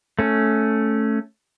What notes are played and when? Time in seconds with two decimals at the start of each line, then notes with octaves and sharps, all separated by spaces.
0.19 A3 C#4